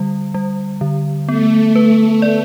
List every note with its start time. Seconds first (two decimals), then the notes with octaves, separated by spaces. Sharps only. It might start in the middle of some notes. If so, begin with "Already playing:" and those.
Already playing: D3 G3
0.34 G3
0.81 D3
1.28 A3 B3
1.76 B4
2.22 D5